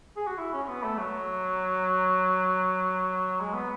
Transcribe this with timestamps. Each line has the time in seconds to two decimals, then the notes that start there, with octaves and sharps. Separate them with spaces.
0.17 G#4
0.27 F#4
0.38 E4
0.53 C#4
0.64 C#4
0.68 B3
0.84 A3
0.98 F#3
3.40 G#3
3.54 B3